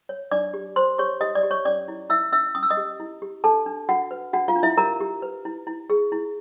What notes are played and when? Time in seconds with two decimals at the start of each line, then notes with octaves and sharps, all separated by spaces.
0.09 C#5
0.31 D4 D5 D6
0.54 G4
0.76 A#4 C5 C6
0.98 G4 C#5 C#6
1.21 G4 D#5 D#6
1.35 D5 D6
1.43 G4
1.51 C#5 C#6
1.65 C#4 D5 D6
1.88 E4
2.10 E4 E5 E6
2.32 C#4 E5 E6
2.55 C#4 D#6
2.63 E6
2.70 D#5 D#6
2.77 G4
3.00 E4
3.22 G4
3.44 D4 A4 A5
3.66 D4
3.88 D4 F#4 F#5
4.11 B4
4.33 D4 F#4 F#5
4.48 F4 F5
4.56 D4
4.63 E4 E5
4.78 G4 A#4 A#5
5.00 G4
5.22 B4
5.45 E4
5.67 E4
5.90 G#4
6.12 E4